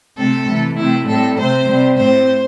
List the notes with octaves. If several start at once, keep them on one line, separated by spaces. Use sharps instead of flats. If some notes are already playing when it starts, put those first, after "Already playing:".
C3 A3 C4 A4
C3 E3 A3
C3 A3 C4 E4
A2 G3 C4 A4
C3 A3 C4 C5
C3 G3 C4
A2 A3 C4 C5